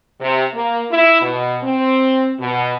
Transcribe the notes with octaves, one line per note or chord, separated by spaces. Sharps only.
C3
A#3
E4
B2
C4
B2